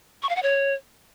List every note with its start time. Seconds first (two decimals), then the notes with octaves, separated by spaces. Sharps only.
0.23 C#6
0.29 F5
0.36 F#5
0.43 C#5